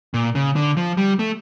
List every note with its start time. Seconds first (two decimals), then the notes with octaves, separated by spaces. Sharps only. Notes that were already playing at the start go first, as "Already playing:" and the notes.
0.14 A#2
0.35 C#3
0.56 D3
0.77 F3
0.97 G3
1.19 A3